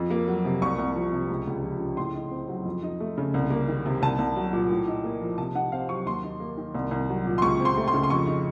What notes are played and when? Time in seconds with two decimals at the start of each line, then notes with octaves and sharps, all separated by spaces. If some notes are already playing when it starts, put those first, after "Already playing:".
Already playing: F2
0.10 A#3
0.28 F#3
0.45 C3
0.62 C2 C#6
0.79 C2
0.96 F3
1.12 C3
1.30 C#2
1.47 C#2
1.63 F3
1.80 C#3
1.97 A2 C6
2.15 D#4
2.31 C4
2.48 F#3
2.65 F2
2.83 D#4
3.00 A3
3.18 C#3
3.34 C2
3.50 A#3
3.68 D#3
3.86 C3
4.02 C2 A5
4.18 C2
4.36 F#3
4.53 A#2
4.70 A2
4.88 D#4
5.04 A#3
5.21 F3
5.38 C3 A5
5.55 D#4 F#5
5.72 C4 F5
5.89 F#3 C#6
6.06 D#2 C6
6.24 D#4
6.40 A#3
6.57 D#3
6.75 C2
6.91 C2
7.09 F#3
7.26 A#2
7.38 C6
7.42 C#2 C#6
7.60 C4
7.65 C6
7.77 A3
7.88 C6
7.94 C#3
8.03 C6
8.10 F2 C#6
8.27 D#4